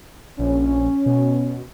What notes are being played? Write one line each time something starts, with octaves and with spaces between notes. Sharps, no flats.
A#1 C#4
B2